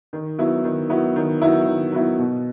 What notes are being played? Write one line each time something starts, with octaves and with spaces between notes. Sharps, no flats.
D#3
F#3 B3 E4
D#3
F#3 B3 E4
D#3
F#3 B3 E4
D#3
F#3 B3 E4
B2